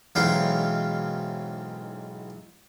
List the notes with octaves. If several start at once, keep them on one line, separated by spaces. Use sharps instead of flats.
B1 G#2 E3 C#4 F5 G5